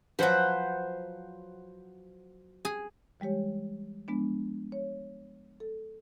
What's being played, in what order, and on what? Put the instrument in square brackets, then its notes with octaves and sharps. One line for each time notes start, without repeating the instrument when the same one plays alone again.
[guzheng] F3 F#3 [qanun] B4 C5 F#5
[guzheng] G#4
[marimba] E3 G3 G#3 G4 C#5
F3 G#3 B3 D4
C#5
A4